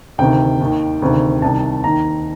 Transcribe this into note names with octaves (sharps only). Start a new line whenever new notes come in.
D2 C3 D#3 G5
D#2 D#3
D2 C3 D#3
C2 C3 D#3 A5
D#2 D#3 A#5